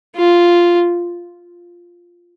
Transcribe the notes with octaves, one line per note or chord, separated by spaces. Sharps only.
F4